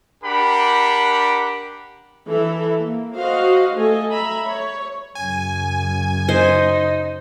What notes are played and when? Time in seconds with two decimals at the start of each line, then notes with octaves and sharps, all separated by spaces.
0.23 D4 G4 A#4 F#5 B5
2.27 E3 A4 E5
2.78 A#3
3.14 F#4 C5 D#5 F5
3.75 A3 A4 D#5 G#5
4.10 E5 A#5 B5
4.47 C#5
5.15 F#2 C#3 G#5
6.29 D#4 C5